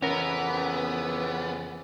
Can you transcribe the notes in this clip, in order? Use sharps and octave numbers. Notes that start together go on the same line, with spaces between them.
F2 C#3 E3 B3 C#4 A#4